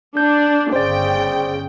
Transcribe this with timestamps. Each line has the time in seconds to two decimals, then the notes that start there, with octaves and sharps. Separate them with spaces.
0.17 D4 G6
0.73 G1 C#3 C5 D5 G5